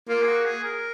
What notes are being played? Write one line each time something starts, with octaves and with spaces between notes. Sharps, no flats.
A#3 F4
G#4
F#4
G#4
A#4